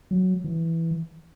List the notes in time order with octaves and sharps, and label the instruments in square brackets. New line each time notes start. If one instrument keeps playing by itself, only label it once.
[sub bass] F#3
E3